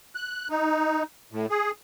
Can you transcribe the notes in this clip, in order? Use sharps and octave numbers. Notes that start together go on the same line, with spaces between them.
F#6
D#4
A2
G#4